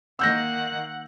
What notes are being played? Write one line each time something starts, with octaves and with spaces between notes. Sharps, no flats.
D#3 A#3 F#5 E6 G6 A#6